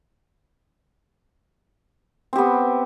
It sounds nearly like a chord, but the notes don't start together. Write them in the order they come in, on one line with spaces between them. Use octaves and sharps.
C4 G4 B3